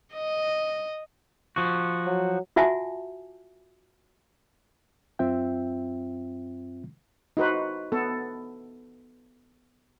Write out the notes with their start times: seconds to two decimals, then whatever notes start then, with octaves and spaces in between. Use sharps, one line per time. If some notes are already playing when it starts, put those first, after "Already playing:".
0.14 D#5
1.56 F3 F#4
2.06 F#3
2.56 F4 F#4 E5 F#5 G#5 A5
5.19 F#2 C4 F4 E5 G5
7.37 D#4 F#4 B4 C5
7.92 B3 A4